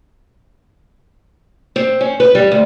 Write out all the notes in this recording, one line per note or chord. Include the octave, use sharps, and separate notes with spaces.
C4
C#4
B4
G3
D2